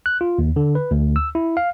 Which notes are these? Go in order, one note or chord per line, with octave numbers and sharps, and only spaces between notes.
F#6
F4
D#2
D3
B4
D2
E6
E4
F5